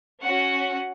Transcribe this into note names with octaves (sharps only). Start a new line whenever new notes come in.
C#4 F#4 F#5